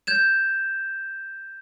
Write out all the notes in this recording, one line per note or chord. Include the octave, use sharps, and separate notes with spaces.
G6 G#6 E7